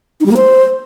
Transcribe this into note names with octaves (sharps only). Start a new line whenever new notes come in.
D#4
G3
A#3
C5